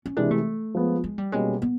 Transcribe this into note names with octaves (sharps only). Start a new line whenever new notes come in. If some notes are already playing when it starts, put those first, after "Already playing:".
C#4
C3 E3 G#3 D4
A3
F3 G#3 B3
G#3
G3
B2 G3 G#3 A#3 C#4
B3